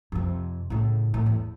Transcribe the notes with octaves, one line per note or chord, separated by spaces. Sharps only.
F2 C3
A2 C#3
A2
E2